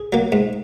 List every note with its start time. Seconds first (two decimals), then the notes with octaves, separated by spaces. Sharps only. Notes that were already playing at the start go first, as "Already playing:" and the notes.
Already playing: G#4
0.13 F#3 A#3
0.32 G#2